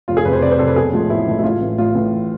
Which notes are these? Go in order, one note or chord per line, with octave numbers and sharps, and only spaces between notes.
F1 F4
G#4
F2 C3 B4
C5
F1 D5
C5
F2 C3 A4
B4
B1 G#4
A2 F3 G#3
B1 E4
A2 F3 G#3
E4
A1 F4
A2 E3
A1 F4
A2 E3